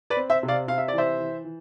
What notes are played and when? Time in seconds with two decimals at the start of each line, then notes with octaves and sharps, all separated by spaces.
0.10 B4 D5
0.16 C4
0.30 C5 E5
0.43 C3
0.48 D5 F5
0.68 C3 F5
0.78 E5
0.88 E3 D5
0.98 C5 E5
1.19 E3
1.45 E3